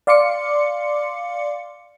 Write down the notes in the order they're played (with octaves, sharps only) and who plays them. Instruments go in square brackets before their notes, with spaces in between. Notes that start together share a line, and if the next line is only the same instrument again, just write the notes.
[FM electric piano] D5 F5 C6 D6 C#7